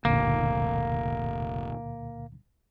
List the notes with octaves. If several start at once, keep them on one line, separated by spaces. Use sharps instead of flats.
F1 C#2 A#2 D3 A#3